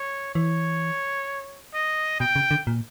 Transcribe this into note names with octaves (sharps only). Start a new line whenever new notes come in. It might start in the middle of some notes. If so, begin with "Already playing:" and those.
Already playing: C#5
E3 C#5
D#5
B2 G5
C#3
D3
A#2